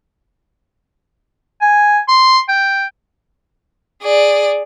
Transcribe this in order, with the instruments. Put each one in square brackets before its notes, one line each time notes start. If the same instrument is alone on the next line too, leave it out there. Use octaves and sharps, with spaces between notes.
[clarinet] G#5
C6
G5
[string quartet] G#4 D5